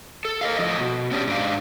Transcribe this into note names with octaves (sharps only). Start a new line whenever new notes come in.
A4
A#4 D#5 F5
A2 F3 A4 D#5
B2
B3 C#4 D4 F#4 G4
G#2 D4 F5